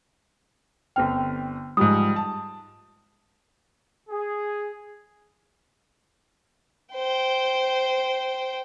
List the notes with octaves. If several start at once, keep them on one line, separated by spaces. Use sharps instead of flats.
G1 C4 G5 F6
G#2 F3 G3 D#6
A5
G#4
C5 G5